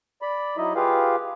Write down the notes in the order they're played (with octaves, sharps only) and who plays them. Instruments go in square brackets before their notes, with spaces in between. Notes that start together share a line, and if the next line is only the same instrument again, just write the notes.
[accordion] D5 B5
F#3 D#4 E4 D#5
F4 G4 G#4 B4 F5